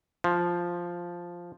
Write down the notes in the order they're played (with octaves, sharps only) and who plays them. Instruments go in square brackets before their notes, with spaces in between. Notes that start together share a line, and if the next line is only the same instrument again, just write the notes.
[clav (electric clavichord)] F3